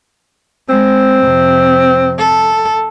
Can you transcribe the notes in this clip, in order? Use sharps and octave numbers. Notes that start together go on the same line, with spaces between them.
G#3 C4
F2 C3
A4